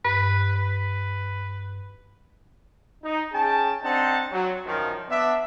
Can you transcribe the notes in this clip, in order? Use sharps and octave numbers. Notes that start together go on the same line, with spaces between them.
G2 B4
B4
D#4
C#4 G#4 G5 A5
C4 D4 D#4 C5 F#5 A5
F#3
F#2 D#3 F3
B3 D4 E5